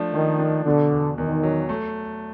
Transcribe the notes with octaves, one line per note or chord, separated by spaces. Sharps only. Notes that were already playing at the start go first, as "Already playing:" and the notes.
Already playing: F3 A3 D4
D#3 F3
D4
B2 D3
E2
E2 D#3
F#3
A3